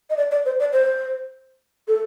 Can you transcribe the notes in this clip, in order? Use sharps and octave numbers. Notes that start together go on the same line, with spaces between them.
D#5
D5
D5
C5
D5
C5
A4